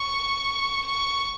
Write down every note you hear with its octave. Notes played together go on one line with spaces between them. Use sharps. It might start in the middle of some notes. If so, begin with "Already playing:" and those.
Already playing: C#6
C#6